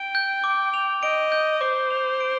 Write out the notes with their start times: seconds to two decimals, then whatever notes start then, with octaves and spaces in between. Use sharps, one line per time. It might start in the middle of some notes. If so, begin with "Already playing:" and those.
Already playing: G5 D7
0.15 G6
0.44 D6
0.74 F7
1.03 D#5 D7
1.32 G6
1.61 C5 D6
1.90 F7
2.20 D7